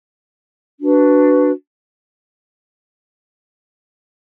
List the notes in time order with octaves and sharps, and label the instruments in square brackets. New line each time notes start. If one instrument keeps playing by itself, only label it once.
[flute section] D4 F#4 B4